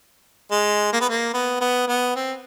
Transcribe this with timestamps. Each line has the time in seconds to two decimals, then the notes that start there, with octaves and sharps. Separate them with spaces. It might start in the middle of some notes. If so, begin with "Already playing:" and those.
0.51 G#3
0.93 A#3
1.00 B3
1.09 A#3
1.34 B3
1.61 B3
1.88 B3
2.16 C4